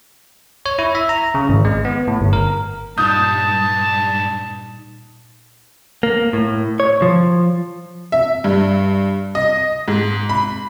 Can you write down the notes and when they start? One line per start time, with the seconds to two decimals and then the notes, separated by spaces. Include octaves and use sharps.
0.66 C#5
0.79 E4
0.95 E5
1.09 A#5
1.34 C#3
1.49 G#1
1.65 G#3
1.85 B3
2.08 A2
2.21 G1
2.33 A#4
2.98 G2 A#2 D#4 A5 D#6 F#6 G6
6.03 A#3
6.33 A2
6.80 C#5
7.02 F3
8.12 E5
8.44 G2
9.35 D#5
9.88 G#2
10.29 B5